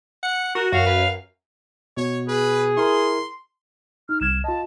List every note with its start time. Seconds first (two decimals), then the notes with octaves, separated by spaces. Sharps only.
0.23 F#5 C#7
0.55 F#4 A#4
0.72 F#2 F#4 F5
0.86 B4
1.97 B2 C#5
2.28 G#4 B4
2.77 E4 A#4 C6
4.09 D#4 F6
4.21 C2 F6 G#6 E7
4.44 F4 D#5 A5